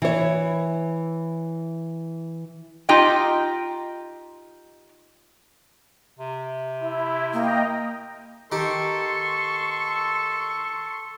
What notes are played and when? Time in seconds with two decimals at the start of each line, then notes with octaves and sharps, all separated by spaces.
0.02 E3 C#5
2.89 D#4 F4 G4 D#5 G5
6.19 C3
6.80 E4
7.33 A#3 D#5 G5 A#5
8.52 D#3 G4 A4 C6 C#6